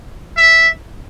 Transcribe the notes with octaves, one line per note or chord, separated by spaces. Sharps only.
E5